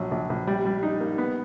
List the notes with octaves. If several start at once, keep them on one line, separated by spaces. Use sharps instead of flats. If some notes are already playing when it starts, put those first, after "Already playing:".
Already playing: A#1 F#3
A#1
A#1
G3
G3
D#4
A#3
B3